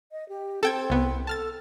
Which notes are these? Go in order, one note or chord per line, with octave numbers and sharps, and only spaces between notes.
D#5
G4
C4 A4 G5 G#6
C2 B3
A4 A5 F6 A6